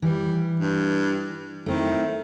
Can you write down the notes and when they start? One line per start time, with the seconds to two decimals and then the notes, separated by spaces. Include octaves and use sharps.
0.02 E3 G3
0.60 G2
1.66 D#3 A3 C4 E4